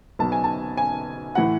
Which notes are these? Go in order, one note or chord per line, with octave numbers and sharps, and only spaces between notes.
B1 B2 A5
G#5
A5
G#5
A2 E3 F#5